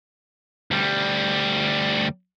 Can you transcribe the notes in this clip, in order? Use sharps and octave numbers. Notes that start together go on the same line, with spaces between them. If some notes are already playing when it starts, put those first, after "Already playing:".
D2 G3